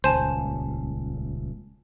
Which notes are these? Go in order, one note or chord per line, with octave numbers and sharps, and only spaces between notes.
D#1 C#2 C5 G#5 A5